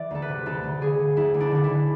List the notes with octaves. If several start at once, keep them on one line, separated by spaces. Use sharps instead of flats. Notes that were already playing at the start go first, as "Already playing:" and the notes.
Already playing: E3 D5 E5
D2 A4
B4
C3
D2 A4
D2
D3 G#4
D3
D2 E4
D2
D4
D3 D4
E4
D3